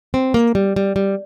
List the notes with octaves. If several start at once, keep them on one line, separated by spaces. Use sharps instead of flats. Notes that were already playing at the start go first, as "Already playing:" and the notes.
C4
A#3
G3
G3
G3